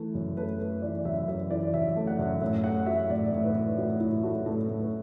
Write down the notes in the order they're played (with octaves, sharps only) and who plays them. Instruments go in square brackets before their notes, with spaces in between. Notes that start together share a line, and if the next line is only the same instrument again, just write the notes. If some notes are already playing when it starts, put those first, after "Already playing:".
Already playing: [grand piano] E3 A3
F#2
A3 B4
A3
E3 D5
F#2 E5
F#2 E5
E3 D5
F#2 E5
A3
F#5
F#2
A2 E5
A3 F#5
F#3 E5
A2 D5
A2
B4
A2
A2 F#4
A2 E4
A3 F#4
A2 A4
A2
B4